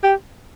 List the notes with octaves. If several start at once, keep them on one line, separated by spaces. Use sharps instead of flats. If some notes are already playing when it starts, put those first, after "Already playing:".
G4